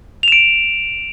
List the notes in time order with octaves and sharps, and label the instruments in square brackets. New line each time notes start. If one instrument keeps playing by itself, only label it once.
[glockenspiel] F7
E7
D7